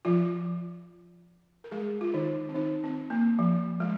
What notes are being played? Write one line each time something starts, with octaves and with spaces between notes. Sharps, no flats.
F3 F4
A#4
G#3 G#4
F4
D#3 D#4
C4
D#3 D#4
C4
A#3
F3
G#3